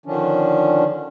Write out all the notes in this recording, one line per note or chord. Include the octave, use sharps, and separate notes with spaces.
D3 D#3 F3 C#4 D4